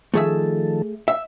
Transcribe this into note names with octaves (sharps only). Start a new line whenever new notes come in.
D#3 F3 A3 G#4 A4 E5
E5